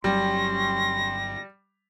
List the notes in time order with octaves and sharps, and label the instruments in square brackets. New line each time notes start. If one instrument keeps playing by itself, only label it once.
[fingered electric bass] G1 F#3 [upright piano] G3 [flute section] C#4 C6 [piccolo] A#6